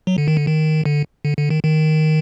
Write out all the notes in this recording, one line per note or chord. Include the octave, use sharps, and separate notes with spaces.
F#3
D3
D#3
D3
D#3
D3
D3
D3
D#3
D#3